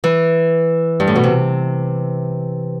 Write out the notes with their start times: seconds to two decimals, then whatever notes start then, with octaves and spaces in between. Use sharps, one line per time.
0.04 E3
1.00 G2
1.07 A2
1.15 B2
1.24 C3